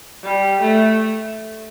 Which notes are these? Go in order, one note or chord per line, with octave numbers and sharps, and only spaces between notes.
G3
A3